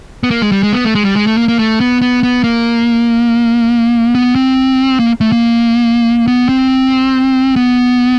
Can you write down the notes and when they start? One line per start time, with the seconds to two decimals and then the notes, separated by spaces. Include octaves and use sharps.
0.23 B3
0.31 A#3
0.42 G#3
0.52 G3
0.63 G#3
0.73 B3
0.85 A3
0.95 G#3
1.05 G3
1.16 G#3
1.27 A3
1.37 A#3
1.48 A#3
1.59 A3
1.80 B3
2.02 B3
2.23 B3
2.44 A#3
4.15 B3
4.35 C4
5.00 A#3
5.21 A3
5.32 A#3
6.28 B3
6.49 C4
7.56 B3